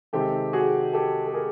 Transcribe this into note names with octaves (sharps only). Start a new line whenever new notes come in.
C3 D#3 G#3 C4 G4 A4
F#4 G#4
G4 A4
A4
G#4 A#4